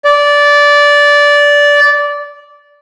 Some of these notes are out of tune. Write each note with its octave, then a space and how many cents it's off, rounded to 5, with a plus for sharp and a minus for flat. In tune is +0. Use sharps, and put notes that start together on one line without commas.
D5 -15